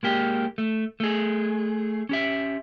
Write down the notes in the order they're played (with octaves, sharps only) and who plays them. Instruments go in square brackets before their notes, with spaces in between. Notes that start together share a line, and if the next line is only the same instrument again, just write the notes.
[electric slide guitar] G#3 A#3 G4
A3
A3 G#4
C#4 G4 E5